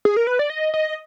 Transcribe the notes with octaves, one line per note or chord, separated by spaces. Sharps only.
G#4
A#4
B4
D5
D#5
D#5